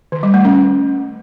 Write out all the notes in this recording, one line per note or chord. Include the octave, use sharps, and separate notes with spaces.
D#3
G3
A3
C#4